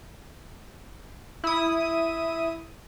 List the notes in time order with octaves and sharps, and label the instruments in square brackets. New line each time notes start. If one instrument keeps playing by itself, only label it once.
[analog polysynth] E4 D#6